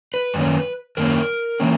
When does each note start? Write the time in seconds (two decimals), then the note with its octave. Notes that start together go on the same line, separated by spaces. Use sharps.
0.14 B4
0.34 F#2 D#3 A#3 C#4
0.97 F#2 D#3 A#3 C#4 A#4
1.60 E3 A#3 C#4